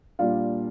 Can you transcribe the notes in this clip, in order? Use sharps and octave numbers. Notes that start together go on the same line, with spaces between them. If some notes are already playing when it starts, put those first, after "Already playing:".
A#2 G3 D4 F4 F5